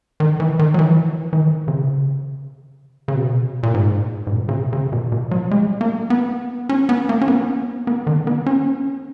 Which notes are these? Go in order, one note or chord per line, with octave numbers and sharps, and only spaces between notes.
D#3
E3
D#3
F#3
E3
E3
D#3
C#3
C#3
B2
A#2
G#2
G#2
A#2
C#3
B2
C#3
B2
B2
F#3
G#3
A#3
B3
C#4
B3
A#3
C#4
B3
B3
D#3
B3
C#4